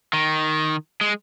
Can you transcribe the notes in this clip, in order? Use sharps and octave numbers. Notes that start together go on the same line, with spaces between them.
D#3
G#3